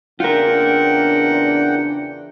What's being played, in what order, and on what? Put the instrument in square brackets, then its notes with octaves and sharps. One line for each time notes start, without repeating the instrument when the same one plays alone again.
[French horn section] E2 C#3 D4 [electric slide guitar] F4 A#4 [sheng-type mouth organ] F#5 G5